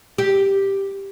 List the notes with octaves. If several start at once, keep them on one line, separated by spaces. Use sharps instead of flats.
G4